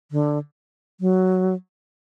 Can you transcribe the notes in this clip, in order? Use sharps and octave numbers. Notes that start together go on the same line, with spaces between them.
D3
F#3